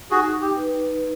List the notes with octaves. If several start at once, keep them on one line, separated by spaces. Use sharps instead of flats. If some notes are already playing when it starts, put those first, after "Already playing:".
D#4 F#4 G#4
G4
B4